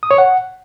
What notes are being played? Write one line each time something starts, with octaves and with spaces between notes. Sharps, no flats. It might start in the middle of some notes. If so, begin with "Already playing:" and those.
D#6
C#5
F#5